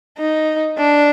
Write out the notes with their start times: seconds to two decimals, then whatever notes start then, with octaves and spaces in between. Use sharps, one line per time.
0.19 D#4
0.78 D4